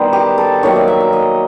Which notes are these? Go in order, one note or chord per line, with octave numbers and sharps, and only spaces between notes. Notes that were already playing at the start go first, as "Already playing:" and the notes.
Already playing: D#3 G3 B3 D#4 C5
G4
A4
D#3 F#3 A#3 C#5
D5
E5
E5
D#5